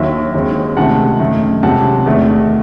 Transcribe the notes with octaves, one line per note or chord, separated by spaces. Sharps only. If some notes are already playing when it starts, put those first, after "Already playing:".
Already playing: D#2 D#3 F#3 E5
D#2 D#3 G#3 C4
C#2 C3 D#3 A3 C4 F#5 A5
F#2 D#3 A3
C#2 C3 F#3 C4 F#5 A5
E2 D#3 A3